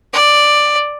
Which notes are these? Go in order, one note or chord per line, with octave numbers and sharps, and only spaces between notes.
D5